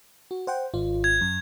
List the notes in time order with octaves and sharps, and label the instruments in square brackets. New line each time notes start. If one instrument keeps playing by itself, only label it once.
[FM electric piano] F#4
C5 F#5 G5
G#1 F4
[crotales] G#6
[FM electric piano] F#2